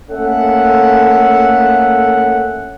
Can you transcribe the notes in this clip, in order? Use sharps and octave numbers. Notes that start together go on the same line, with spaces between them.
A3 A#3 C#4 A4 E5 F#5